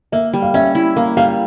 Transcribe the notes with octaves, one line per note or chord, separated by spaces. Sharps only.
A#3 E5
G3
F5
C#4 E5
E4
A#3 F5
G3 F5